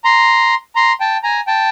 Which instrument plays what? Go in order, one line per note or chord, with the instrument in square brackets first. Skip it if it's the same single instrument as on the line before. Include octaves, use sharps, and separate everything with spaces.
[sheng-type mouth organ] A#5 C6
A#5 C6
G5 A5
G#5 A#5
G5 A5